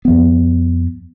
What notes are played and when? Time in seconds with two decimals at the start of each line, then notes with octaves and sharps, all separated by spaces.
0.05 F2 F3 B3